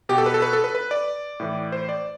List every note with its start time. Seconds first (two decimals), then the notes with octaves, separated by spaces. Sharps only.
0.09 B2 G4
0.18 A4
0.26 B4
0.34 A4
0.42 B4
0.53 A4
0.64 B4
0.75 B4
0.91 D5
1.40 A2 E3
1.72 C5
1.89 D5